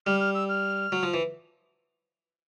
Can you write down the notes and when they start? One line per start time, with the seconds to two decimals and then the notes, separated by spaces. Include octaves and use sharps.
0.06 G3 F6
0.20 F6
0.35 E6
0.49 F6
0.92 F#3
1.03 F3
1.14 E3